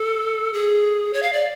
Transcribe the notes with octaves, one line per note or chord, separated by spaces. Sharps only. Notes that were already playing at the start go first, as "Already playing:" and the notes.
Already playing: A4
G#4
C#5
F5
D5